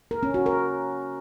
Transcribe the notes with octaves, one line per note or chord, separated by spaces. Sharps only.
A#4
C#4
F#4
A#4